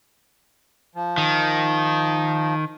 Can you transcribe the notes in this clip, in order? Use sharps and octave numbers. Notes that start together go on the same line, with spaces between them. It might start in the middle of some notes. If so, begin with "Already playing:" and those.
F3
D#3